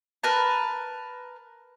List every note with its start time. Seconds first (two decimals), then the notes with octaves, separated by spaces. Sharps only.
0.23 A#4 B4 A5